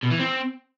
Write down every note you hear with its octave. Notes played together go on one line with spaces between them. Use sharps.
B2
E3
C4